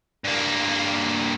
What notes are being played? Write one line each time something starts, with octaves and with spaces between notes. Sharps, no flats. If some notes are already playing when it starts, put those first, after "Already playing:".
G2 A#3